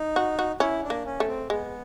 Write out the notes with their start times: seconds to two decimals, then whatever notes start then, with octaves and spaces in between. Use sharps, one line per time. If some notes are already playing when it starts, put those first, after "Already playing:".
Already playing: D#4
0.16 F#4
0.39 F#4
0.60 C#4 E4
0.83 D4
0.90 A#3
1.06 C#4
1.20 A3
1.27 C4
1.50 G#3 B3